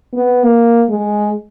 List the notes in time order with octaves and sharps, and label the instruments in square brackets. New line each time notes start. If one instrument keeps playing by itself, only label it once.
[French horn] B3
A#3
G#3